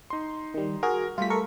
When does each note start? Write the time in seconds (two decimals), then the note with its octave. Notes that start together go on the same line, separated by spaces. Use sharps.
0.10 D#4 C6
0.54 D#3 G3
0.83 F#4 G#4 A#4
1.18 G3 A3 F4 B6
1.30 A4 A#4 C#6